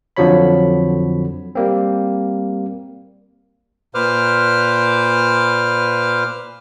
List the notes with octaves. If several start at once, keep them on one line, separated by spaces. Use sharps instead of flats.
F2 D3 F3 F#3 C#5 B5
G3 A#3 C4
A#2 B4 C5 D6 F6